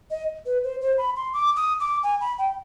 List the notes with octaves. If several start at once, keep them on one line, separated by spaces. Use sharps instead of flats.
D#5
B4
C5
C5
B5
C6
D6
D#6
D6
G#5
B5
G5